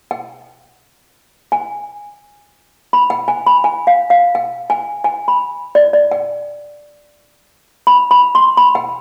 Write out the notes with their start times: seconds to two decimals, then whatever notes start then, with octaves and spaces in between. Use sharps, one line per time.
0.11 G5
1.52 G#5
2.93 B5
3.10 G5
3.28 G#5
3.47 B5
3.64 G#5
3.87 F5
4.10 F5
4.35 G5
4.70 G#5
5.04 G#5
5.28 B5
5.75 D5
5.93 D5
6.11 G5
7.87 B5
8.11 B5
8.35 C6
8.57 B5
8.75 G5